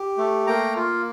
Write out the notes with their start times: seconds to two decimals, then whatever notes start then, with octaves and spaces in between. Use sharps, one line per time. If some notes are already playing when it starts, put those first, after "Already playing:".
Already playing: G4
0.18 A3
0.47 A#3 G5 A#5
0.76 F4